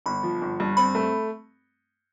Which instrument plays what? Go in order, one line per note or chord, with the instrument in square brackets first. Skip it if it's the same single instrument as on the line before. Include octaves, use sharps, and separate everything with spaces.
[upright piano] G1 [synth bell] B5
[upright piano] F3
G1
G2
[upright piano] C4 [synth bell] B5
[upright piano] A3